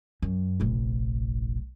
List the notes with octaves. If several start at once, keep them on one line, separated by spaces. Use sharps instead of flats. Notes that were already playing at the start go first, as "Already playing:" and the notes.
F#2
F1 A#1